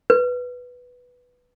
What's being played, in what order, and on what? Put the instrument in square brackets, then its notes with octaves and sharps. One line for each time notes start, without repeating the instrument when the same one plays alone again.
[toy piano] B4